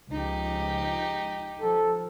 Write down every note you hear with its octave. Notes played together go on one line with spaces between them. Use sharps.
C#2 F3 D#4 G4
F3 A4